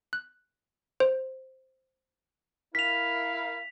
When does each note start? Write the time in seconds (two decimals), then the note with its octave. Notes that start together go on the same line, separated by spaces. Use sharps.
0.13 F#6
1.00 C5
2.75 E4 A#4 F5 B6 F7